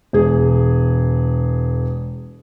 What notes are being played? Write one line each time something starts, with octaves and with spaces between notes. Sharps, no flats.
E1 G#4